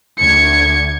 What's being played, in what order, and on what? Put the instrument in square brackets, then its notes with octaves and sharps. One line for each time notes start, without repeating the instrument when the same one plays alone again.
[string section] D2 G#6 [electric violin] C#7